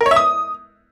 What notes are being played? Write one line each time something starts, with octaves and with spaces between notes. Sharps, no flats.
A#4
C#5
E5
D#6